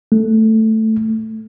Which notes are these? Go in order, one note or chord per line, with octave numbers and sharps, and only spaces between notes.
A3